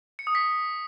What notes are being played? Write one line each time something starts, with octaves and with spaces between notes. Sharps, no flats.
C#7
D#6
B6